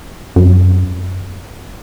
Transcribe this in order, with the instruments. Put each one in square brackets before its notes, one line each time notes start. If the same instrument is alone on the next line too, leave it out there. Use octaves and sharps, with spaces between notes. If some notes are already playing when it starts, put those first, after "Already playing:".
[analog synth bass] F#2